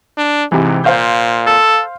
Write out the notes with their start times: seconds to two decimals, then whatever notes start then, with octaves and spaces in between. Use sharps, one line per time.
0.18 D4
0.52 G#2 C3 E3
0.84 A#2 C5 F5 G6
1.47 A4